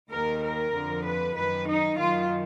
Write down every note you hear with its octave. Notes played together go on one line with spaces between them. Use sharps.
D#2 D#3 A#4
A#4
F2 D3 F3
B4
F#2 D#3 B4
D#4
F#2 D#3 F4